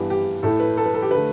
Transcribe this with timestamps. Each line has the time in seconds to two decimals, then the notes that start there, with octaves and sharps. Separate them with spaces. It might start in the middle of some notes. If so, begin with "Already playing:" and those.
Already playing: G2 E3 B3 D4 G4
0.10 G4
0.43 A2 A3 E4 A4
0.60 B4
0.77 A4
0.86 B4
0.94 A4
1.02 G4
1.11 D3 A3 B4